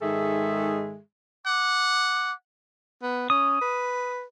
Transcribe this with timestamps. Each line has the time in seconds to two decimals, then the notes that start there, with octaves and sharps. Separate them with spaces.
0.02 G#2 D#3 G#3 G#4 A4 E5
1.46 F#5 D6
3.02 B3
3.30 C#4 D#6
3.61 B4